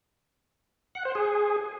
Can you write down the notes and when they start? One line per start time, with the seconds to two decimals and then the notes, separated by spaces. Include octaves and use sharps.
0.95 F#5
1.05 C5
1.15 G#4